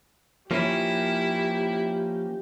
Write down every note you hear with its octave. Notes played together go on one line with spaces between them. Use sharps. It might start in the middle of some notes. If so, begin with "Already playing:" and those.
F3 A#3 C#4 E4 G4